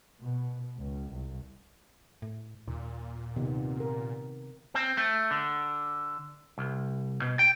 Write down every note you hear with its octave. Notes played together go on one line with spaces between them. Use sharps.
B2
C#2
C2
A2
D#2 A#2
C3 D#3 B3
A#4
C4
A3
D3
C2
B2
G5